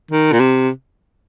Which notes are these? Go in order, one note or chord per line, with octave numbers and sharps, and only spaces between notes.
D#3
A#2
C3